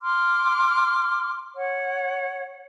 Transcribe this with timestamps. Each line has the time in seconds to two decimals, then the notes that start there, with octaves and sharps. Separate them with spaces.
0.01 C6 D6 F6
1.56 C#5 F#5